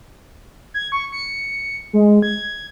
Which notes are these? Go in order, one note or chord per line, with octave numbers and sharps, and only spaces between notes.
G#6
C#6
C#7
G#3
G#6